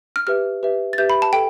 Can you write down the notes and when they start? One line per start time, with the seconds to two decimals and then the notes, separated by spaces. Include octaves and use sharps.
0.16 F6
0.27 G4 B4 E5 F6
0.63 G4 B4 E5
0.93 A6
0.98 G4 B4 E5 G6
1.10 B5
1.22 A5
1.33 A4 G5